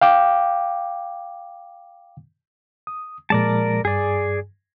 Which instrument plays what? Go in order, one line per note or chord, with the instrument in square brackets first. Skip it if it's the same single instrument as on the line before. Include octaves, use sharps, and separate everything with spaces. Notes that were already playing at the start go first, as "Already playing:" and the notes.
[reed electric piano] F5 G5 D6
D#6
[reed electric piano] A#2 F3 G#3 [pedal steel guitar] A#4 D5 A5
[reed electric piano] G2 [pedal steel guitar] G#4 D5